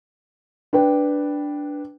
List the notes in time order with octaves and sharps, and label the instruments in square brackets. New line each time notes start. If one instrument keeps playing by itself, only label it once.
[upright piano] D4 B4 G5